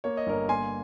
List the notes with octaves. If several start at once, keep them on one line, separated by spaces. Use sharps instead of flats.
A#3 C#5
D#5
G1 A#4 C#5
A#3 G#5 C6